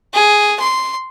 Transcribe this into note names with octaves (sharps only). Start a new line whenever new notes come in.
G#4
C6